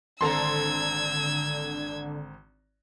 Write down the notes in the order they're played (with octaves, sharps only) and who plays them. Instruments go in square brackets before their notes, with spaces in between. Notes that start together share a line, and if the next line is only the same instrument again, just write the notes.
[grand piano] G#1 C4 A#5 [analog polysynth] D3 [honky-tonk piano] A4 C6 [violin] E6 G#6